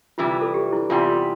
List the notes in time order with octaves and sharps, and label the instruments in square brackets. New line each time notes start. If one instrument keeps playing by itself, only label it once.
[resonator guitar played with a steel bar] C3 E3 G3 [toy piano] F4
[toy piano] A4
G4
E4
[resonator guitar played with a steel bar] E2 C3 G3 [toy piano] F4